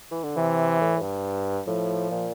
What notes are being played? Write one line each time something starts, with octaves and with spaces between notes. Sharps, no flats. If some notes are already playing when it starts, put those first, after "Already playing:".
E3
D3
C3 E3
A2
A2
G2
A2 F3
A#2